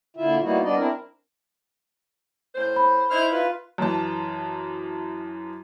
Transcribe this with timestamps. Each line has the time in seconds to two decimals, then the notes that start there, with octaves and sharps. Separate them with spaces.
0.16 A#2 D3 E4 F4 E5
0.41 G3 A#3 B3 D#4 E4 F#4
0.63 G3 B3 D4 D5 D#5
0.76 C4 D4 E4 A#4
2.55 A2 C#4 C5
2.76 B5
3.10 D#4 E4 C5 F6
3.32 F4 B4
3.78 F#2 E3 A5